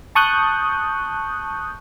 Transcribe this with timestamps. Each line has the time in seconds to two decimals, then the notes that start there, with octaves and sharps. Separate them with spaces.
0.15 A5 C#6 D#6 F#6 G6